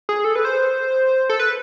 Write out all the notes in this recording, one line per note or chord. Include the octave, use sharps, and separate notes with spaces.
G#4
A4
B4
C5
A4
B4